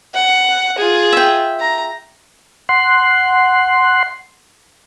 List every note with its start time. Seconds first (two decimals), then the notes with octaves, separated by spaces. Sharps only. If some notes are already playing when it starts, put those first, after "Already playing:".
0.15 F#5
0.78 F4 G#4
1.13 E5 G5
1.60 A#5
2.69 F#5 C6